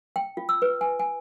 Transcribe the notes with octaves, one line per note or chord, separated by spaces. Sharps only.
G5
F4
E6
B4
G#5
G#5